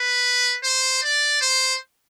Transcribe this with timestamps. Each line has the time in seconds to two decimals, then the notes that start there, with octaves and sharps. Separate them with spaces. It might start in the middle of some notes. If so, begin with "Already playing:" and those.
Already playing: B4
0.64 C5
1.03 D5
1.41 C5